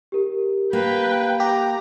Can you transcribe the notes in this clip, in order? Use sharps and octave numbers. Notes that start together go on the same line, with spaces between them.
G4 A#4
A#3 B4 G5
G4 A#5